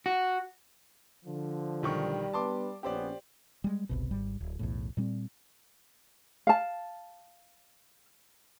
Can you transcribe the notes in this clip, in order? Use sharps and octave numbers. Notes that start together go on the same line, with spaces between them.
F#4
D3 F3
B1 D#3 G3 C#6
B3 D4 B4 A5 C6 D6
A#1 B3 C#4 G4 C5 D5
G3 G#3
G1 C2 B2
G#1 G#2 G3
D1
B1 E2 A2
A#2 G3 C4
F5 A5